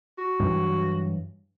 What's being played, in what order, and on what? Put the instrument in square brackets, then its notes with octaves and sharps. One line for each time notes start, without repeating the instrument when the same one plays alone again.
[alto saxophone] F#4
[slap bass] G2 E3 F#3